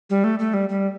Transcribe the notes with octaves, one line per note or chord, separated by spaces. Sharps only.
G3
A3
A3
G3
G3